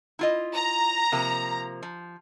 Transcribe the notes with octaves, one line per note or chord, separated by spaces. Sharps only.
E4 F4 D#5
A#5
C3 F3 A#3
F3